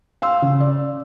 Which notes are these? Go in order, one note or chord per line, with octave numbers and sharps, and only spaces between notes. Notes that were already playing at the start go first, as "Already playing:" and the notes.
F5 C6 E6
C#3
D5